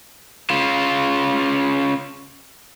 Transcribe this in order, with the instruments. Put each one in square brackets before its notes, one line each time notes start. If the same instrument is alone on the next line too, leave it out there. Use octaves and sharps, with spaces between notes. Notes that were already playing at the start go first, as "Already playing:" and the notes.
[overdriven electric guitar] C#3 F4